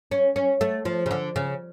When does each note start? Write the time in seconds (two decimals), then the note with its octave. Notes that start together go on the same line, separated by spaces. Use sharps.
0.11 C#4
0.36 C#4
0.61 A3
0.85 F3
1.06 C#3
1.11 D3
1.36 C#3